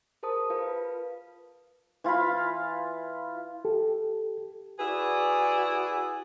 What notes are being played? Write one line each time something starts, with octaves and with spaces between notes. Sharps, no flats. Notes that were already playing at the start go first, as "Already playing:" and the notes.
G#4 A#4 C5 A5 D#6
F4 B4 F5
E3 F4 F5 B5
G4 A4
E4 F#4 G#4 B4 D5